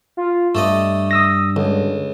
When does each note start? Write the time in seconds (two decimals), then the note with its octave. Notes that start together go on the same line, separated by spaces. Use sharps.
0.17 F4
0.55 G2 A3 D5 D#5
1.11 D#6 E6 A#6
1.56 C#2 D3